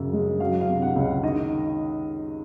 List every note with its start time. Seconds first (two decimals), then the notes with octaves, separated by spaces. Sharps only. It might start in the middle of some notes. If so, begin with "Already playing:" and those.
Already playing: F#2 C#3
0.13 G#3
0.40 F#3 F5
0.61 F5
0.69 C3
0.82 F#5
0.96 C#2
1.23 D#3 D#5